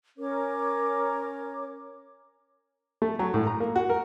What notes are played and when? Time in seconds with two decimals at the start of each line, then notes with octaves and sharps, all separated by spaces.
0.18 C#4 A#4 C#5 D6
3.02 A3
3.19 F#3
3.34 A2
3.47 A#5
3.60 A#3
3.76 F#4
3.90 A#4